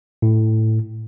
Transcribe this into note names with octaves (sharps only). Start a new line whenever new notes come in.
A2